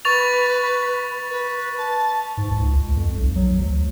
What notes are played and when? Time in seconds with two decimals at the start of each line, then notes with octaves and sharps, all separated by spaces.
0.05 B4 C#6 A6 F7
1.30 B4
1.77 A5
2.37 G#2
2.50 C#2
2.75 C#2
2.96 F2
3.17 B1
3.36 F#3
3.60 D2